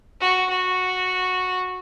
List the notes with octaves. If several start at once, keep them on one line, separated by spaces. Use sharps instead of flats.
F#4
F#4